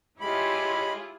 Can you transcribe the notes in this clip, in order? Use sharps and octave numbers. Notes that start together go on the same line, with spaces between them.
G#3 E4 F4 G4 G#4 C#5 B5